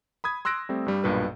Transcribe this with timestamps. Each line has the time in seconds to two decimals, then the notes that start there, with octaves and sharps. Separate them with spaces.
0.24 B5 D#6 G#6
0.45 C6 E6 F#6 A#6 D7
0.69 G3 A3 C4
0.86 G2 G3
1.04 B1 G2 A#2 B4